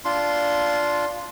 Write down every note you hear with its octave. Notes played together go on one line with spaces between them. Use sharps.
D4 F4 C6